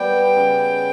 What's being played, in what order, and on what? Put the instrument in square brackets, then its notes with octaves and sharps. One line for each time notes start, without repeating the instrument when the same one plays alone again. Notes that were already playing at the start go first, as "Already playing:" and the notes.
Already playing: [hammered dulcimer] G3 B3 [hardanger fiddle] G5
[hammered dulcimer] C#3